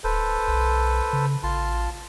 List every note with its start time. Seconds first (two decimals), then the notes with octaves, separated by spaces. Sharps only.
0.04 D1 A4 B4 C5
0.48 B1
1.13 C#3
1.43 A1 F4 A5 C6